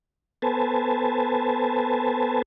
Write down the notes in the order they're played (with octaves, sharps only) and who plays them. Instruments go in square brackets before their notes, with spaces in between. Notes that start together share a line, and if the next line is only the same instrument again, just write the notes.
[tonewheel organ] B3 A4 B4 C5 G#5 A5